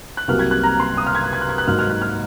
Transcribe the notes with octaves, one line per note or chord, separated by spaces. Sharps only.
F#6
C2 C3 F#3 A#3 F6
G#6
F#6
A#5
C6
D#6
F6
G#6
F#6
G#6
F#6
G#6
F#6
G#2 F#3 A#3 D#4 F6
F6
F#6
F6